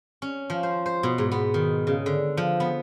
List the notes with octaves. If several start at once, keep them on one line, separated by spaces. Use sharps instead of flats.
C#4
F3
C5
C5
B2
G#2
B3
D#3
C#3
D3
F3
B3